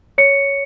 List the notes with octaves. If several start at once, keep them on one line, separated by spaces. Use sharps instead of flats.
C#5 C#7